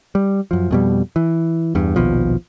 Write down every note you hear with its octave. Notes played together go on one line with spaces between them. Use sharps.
G3
F#2 F3
F2 B2 G3
E3
E2 G2
A#1 D#2 B2 F3